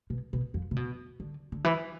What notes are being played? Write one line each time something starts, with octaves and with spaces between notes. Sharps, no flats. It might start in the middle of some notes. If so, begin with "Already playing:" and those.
B2
B2
F2
C3
B2
D3
D3
E3